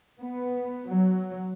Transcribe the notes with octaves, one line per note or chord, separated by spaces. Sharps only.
B3
F#3